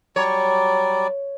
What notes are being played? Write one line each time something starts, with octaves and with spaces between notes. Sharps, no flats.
F#3 G3 C#5 D5